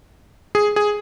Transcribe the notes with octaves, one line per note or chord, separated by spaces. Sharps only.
G#4
G#4